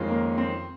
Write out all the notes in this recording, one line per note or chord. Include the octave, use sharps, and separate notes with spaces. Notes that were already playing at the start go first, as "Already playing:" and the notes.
Already playing: F2 D#3 G#3 C#4 F4
A#3
C4